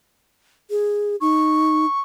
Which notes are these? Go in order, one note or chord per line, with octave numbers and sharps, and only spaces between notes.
G#4
D#4 C#6